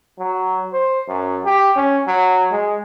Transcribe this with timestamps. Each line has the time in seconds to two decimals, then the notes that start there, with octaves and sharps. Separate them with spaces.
0.20 F#3
0.73 C5
1.08 F#2
1.45 G4
1.77 C#4
2.07 F#3
2.52 G#3